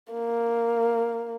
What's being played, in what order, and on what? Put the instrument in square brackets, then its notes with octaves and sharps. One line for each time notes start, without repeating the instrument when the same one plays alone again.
[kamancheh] A#3